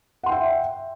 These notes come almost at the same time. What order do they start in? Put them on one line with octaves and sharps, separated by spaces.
F#5 C6 G5 E5